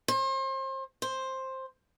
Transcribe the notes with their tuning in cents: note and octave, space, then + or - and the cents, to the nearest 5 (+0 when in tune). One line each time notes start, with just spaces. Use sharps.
C5 +35
C5 +10